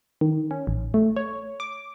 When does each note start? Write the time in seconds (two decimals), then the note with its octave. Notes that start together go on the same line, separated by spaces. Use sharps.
0.21 D#3
0.51 C#4
0.67 A1
0.94 A3
1.17 C#5
1.60 D6